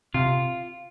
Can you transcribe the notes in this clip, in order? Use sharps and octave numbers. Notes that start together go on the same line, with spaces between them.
C3 F4